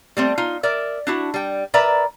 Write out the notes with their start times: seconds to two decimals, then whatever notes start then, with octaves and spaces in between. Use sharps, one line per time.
0.17 G3 A3 C4
0.38 D#4 F4
0.63 A#4 D5 E5
1.07 D4 E4 F#4
1.34 G3 G5
1.74 A#4 B4 D5 E5 A#5